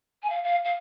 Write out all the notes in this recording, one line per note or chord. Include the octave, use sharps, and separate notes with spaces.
G#5
F5
F5
F5